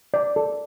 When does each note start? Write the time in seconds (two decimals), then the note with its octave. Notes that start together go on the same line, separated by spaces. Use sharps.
0.14 D5
0.36 A4